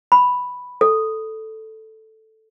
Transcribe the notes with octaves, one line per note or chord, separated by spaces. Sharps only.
B5
A4